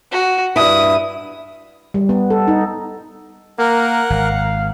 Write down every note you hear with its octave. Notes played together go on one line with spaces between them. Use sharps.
F#4
G2 E4 D#6
G3
B3
A4
D#4
A#3 A#4 F#5
G#1 F5